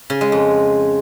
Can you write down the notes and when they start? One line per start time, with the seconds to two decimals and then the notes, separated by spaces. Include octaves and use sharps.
0.10 C#3
0.21 G#3
0.32 F2